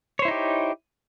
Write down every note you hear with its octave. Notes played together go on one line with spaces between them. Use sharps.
D#4 E4 G4 C5 C#5